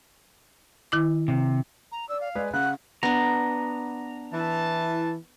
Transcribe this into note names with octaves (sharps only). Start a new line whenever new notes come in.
D#3 E4 D6
C3
A#5
D5 E6
F5
G#3 G#4 B4 D5
C#3 F#5 F#6
B3 D4 A#5
E3 E4 A5